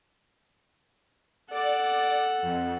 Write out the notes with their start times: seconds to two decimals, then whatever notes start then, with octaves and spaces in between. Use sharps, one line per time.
1.51 A4 D5 F#5
2.42 F2